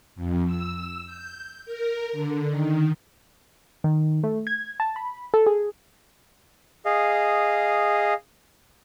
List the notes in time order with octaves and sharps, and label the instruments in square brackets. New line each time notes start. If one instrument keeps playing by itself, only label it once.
[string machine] F2
E6
G6
A#4
D3
D#3
[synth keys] D#3
A3
G#6
A5
B5
A4
G#4
[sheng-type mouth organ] G#4 D#5 F5